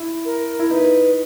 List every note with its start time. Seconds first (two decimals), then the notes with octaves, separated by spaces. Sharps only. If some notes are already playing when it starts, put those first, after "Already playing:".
Already playing: E4
0.25 A#4
0.59 E4
0.70 D#4 B4